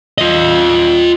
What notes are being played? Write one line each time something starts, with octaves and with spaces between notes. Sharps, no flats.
F4 D#5